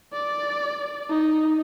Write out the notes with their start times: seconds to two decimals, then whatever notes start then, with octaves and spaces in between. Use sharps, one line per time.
0.13 D5
1.10 D#4